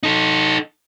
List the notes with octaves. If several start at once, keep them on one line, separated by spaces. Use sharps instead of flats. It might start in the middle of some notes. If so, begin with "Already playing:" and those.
D#4 A4